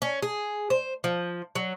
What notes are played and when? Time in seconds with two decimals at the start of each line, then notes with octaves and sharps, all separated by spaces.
0.02 C#4
0.22 G#4
0.70 C5
1.04 F3
1.55 F#3